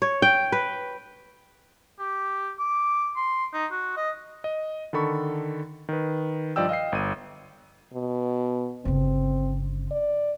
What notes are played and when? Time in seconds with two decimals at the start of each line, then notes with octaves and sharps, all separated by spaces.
0.02 C#5
0.22 G5
0.52 B4
2.00 G4
2.59 D6
3.17 C6
3.54 D#4
3.72 F#4
3.97 D#5
4.44 D#5
4.93 D3 D#3 A4 B5 C#6
5.89 D#3 B4
6.56 G2 F3 D5 D#5 G5 E6
6.69 D#5 F5 G5 C7
6.92 G1 D#7
7.93 B2
8.85 G1 C#3 C4
9.91 D5